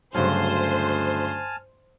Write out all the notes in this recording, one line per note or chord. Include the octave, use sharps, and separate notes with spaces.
D2 G2 C#3 F#3 C5 G#5 A5 F6